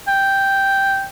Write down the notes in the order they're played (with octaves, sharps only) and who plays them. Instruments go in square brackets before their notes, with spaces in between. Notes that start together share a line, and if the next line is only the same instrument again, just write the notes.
[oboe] G5